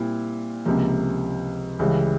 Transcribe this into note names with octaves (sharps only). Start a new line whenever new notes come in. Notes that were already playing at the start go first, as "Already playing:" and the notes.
Already playing: A#2 G3 C4 E4
C#2 C3 F3 A#3
C#2 C#3 E3 G3